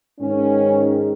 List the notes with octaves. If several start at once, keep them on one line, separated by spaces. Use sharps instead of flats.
G#2 D#3 G#3 C#4